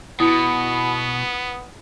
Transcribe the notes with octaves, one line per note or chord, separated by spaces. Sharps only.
B2 B3 E4 B5 D#6 C#7